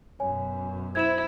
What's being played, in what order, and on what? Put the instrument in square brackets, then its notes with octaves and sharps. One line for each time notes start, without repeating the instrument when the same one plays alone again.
[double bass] F#2 B2 [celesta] C#5 G#5
[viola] E4 [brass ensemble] C5 [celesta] G#6 E7